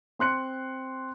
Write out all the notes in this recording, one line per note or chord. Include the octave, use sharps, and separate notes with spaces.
C4 C6 F#6 C#7